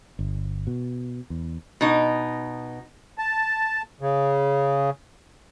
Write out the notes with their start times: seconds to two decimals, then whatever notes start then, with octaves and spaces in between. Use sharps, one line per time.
0.19 G1
0.67 B2
1.30 E2
1.81 B2 D#4
3.18 A5
4.01 C#3